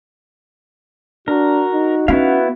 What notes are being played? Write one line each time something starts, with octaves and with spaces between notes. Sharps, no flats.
D4 F#4 A#4
D#4
B3 C#4 E4 F#4 F5